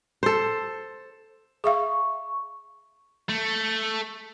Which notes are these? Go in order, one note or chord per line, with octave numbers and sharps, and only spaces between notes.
A4 C5
G#4 E5 F5 C#6
A3